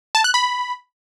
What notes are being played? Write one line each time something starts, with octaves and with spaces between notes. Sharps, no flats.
A5
F#6
B5